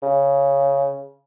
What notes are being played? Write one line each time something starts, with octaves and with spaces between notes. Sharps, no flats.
C#3